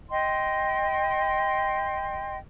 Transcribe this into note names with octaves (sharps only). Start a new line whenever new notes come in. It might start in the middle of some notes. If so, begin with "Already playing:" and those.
D#5 G5 C6